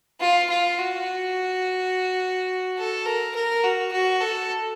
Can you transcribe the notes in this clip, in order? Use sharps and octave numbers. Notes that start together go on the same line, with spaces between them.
F4
F4
F#4
A4
A#4
A#4
F#4
F#4
A4